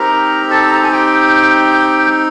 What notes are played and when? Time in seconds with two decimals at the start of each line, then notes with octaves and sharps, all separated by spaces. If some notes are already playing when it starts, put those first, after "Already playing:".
Already playing: C4 D#4 G4 A#4 A#5
0.50 A4 A5
0.66 A#5
0.75 A5
0.83 G#5
0.92 G4 G5